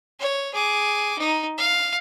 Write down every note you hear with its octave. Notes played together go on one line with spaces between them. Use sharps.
C#5
G#4 D6
D#4
F5